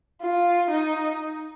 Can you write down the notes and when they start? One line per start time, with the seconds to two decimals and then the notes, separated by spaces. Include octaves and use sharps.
0.22 F4
0.70 D#4